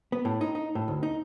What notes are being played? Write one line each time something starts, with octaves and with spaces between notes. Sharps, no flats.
B3
A2
D#4
D#4
A2
D2
D#4